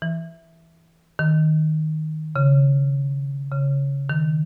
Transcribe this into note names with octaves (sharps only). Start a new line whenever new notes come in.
E3
D#3
C#3
C#3
D#3